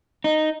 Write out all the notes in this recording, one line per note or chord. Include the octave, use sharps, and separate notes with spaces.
D#4